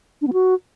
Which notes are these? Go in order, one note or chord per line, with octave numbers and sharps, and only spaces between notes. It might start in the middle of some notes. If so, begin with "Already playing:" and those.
D4
B3
F#4